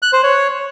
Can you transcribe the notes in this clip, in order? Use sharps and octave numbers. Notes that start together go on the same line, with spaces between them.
F#6
C5
C#5